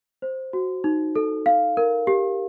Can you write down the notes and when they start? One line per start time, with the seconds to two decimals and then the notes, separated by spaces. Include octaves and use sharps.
0.22 C5
0.53 F#4
0.84 D#4
1.16 A4
1.46 F5
1.77 A#4
2.07 G4